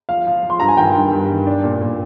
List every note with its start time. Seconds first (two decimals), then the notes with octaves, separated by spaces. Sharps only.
0.09 F3 F5
0.27 F3
0.43 F3
0.50 C6
0.60 G2 A#5
0.68 G#5
0.77 D#3 G5
0.95 G2
1.12 G2
1.30 D#3
1.47 D4
1.64 A#2
1.82 A#2